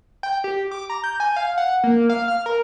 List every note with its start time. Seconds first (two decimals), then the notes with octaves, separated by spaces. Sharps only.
0.23 G5
0.44 G4
0.71 D6
0.90 A#5
1.04 G6
1.20 G#5
1.36 F5
1.58 F#5
1.84 A#3
2.10 F5
2.28 F6
2.46 A#4